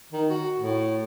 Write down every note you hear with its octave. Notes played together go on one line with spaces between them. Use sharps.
D#3
F#4
A2